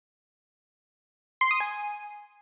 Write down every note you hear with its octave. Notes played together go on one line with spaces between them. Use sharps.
C6
D#6
G#5